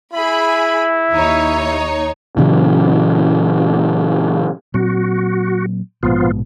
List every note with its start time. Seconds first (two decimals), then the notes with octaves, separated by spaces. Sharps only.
0.13 E4 G#4 B5
1.12 D#2 D#4 C#5
2.37 A#2 C#3 E3 F#3
4.74 A#2 F#3 C4 F#4
6.03 A#1 G#2 B2 F3 B3 F4